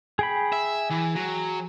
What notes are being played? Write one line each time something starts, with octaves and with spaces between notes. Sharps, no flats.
G#4 G5 B5
E5
E3
F#3